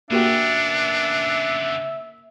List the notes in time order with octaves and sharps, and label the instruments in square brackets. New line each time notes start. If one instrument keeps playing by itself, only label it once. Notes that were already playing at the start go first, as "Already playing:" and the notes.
[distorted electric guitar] C#3 B3 [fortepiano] A#3 F#4 G4 [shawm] D4 [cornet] E5